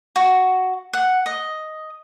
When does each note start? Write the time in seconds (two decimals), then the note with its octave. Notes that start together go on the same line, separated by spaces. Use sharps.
0.16 F#4
0.93 F#5
1.26 D#5